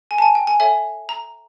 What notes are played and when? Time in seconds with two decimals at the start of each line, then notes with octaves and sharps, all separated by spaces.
0.11 G#5
0.18 A5
0.22 G#5
0.35 G5
0.47 G#5
0.60 A4 C#5 E5 G#5
1.09 A#5